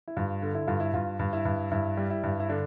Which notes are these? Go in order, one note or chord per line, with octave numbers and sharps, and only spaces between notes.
E4
G2 F4
D3
E4
G2 F4
E4
G2 F4
G2
E4
G2
G2 E4
G3
E4
G2
E4
D3 D4